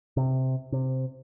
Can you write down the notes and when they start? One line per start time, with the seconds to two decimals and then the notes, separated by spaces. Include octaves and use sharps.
0.17 C3
0.72 C3